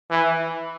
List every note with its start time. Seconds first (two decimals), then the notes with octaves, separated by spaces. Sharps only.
0.11 E3